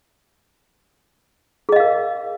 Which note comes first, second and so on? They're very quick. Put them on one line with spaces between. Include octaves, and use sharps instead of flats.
G#4 D#5 F5 A#4